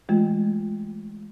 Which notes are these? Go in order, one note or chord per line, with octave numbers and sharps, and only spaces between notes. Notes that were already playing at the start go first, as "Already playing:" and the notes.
E3 G#3 A3 F4